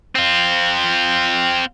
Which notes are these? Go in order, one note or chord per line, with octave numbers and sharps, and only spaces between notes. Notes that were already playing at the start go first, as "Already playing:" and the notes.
C4 F4